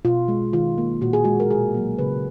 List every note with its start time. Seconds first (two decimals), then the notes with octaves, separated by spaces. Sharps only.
0.05 B2 F4
0.28 G#3
0.53 D#3 F4
0.78 A#3
1.01 A#2 F#4
1.13 G#4
1.24 G#3 F#4
1.40 A#4
1.50 B2 G#4
1.75 F#3 A#3
1.99 C#3 B4